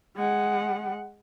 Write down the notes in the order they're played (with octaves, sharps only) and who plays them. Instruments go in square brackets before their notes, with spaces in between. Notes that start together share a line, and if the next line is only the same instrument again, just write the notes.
[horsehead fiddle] G#3 F#5